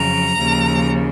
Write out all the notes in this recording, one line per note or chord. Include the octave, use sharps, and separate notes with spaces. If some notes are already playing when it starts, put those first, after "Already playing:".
Already playing: F2 C#3 F#3 A#5
D#2 C#3 F3